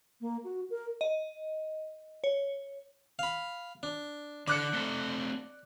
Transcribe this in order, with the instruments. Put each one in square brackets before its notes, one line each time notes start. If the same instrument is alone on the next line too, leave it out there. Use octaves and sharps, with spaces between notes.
[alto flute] A#3
F#4
A#4
[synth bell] D#5
C#5
[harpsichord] F5 B5
D4
[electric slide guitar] D3 A4 [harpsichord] D5 [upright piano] D6 F#6 C#7
[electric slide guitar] A3 C4 A4